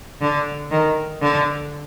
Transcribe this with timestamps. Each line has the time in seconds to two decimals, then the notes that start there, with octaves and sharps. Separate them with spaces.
0.21 D3
0.71 D#3
1.22 D3